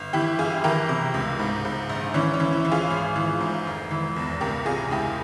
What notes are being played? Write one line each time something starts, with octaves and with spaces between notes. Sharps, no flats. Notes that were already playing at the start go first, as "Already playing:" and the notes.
Already playing: G1
E3 E4 G4
G1 F4 G#4
E3 G4 A#4
C3
C#2
G#2
G#2
A#1
E3 C#4
C#4
E3
E4
E3
F4 G#4
G#1
E3
G#2
F1
E3
E2
C#2 G4 A#4
C3 F4 G#4
C#2 E4 G4